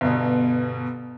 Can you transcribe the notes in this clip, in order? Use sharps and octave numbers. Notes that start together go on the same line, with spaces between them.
G1 B2